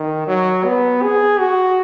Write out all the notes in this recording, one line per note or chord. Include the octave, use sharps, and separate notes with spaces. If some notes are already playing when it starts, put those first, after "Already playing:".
Already playing: D#3
F#3
B3
G#4
F#4